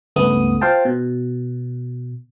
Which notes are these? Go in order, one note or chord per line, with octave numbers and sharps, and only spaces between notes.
C#2 G2 A3 B3 D#6
F4 C5 F5 G5 A5
B2